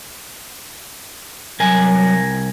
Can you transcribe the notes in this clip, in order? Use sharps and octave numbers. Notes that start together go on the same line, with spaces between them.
C2 F#3 A#4 G#5